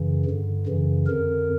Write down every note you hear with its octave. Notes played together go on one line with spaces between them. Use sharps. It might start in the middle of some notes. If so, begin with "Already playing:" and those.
Already playing: F#2 C#3 E3
G2 D3
F#2 C#3 E3
F2 D3 A#4